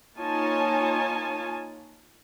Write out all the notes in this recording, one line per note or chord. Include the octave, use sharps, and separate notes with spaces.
A#3 D#4 F4 C#5 G#5 A5